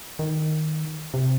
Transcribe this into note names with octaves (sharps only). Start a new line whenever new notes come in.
D#3
C3